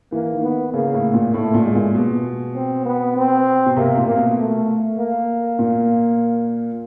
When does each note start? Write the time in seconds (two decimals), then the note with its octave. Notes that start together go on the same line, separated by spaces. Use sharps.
0.12 E3 A#3
0.32 D#3
0.43 B3
0.74 C#3 A#3
0.94 A2
1.14 A#2
1.34 A2 A3
1.54 A#2
1.64 G#3
1.75 A#2
1.95 B2
2.55 C4
2.85 B3
3.16 C4
3.66 B2
3.76 C3 A#3
3.97 A#2
4.07 A#3
4.18 B2
4.37 A3
4.98 A#3
5.59 A#2